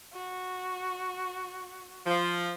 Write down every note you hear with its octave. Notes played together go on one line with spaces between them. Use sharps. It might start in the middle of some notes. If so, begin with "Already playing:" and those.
F#4
F3